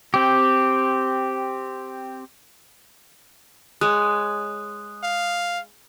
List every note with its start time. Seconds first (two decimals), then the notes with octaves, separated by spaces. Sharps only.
0.14 C4 G4
3.81 G#3 C#5 D#6 F#6
5.04 F5